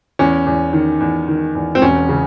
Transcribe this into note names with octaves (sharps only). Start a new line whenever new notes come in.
E2 C#4
E2
D#3
E2
D#3
E2
C4
E1 C#4
C#3